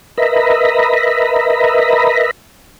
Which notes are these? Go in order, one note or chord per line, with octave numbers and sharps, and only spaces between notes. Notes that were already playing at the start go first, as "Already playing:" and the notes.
A#4 B4 D#5 E5 A#5 B5